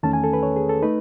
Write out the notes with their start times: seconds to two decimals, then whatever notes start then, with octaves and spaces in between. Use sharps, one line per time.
0.03 E2 D#3 A3 C#4 A5
0.13 G#5
0.24 A4
0.33 B4
0.43 C#5
0.56 G#4
0.69 A4
0.83 A3 D#4 B4